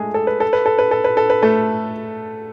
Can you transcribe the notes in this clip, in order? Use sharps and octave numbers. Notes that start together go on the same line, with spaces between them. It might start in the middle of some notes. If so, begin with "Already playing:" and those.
Already playing: G#3 A3 G#4
A4
B4
A4
B4
A4
B4
A4
B4
A4
B4
A3 A4